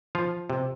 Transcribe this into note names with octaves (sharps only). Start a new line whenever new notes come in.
F3 F4
C3